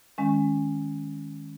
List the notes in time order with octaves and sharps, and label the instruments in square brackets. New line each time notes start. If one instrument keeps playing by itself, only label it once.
[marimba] D#3 G#3 C#4